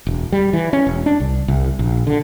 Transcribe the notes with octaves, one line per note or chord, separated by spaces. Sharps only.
E1
G3
E3
C#4
E1
D4
C2
C2
A#1
D3